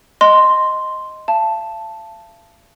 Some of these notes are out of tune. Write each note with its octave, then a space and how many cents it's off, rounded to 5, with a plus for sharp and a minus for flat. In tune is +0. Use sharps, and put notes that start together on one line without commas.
D#5 +0 C6 +0
F5 -45 A5 +0